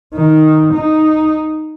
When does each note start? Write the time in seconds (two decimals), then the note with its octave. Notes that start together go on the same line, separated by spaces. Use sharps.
0.15 D#3
0.74 D#4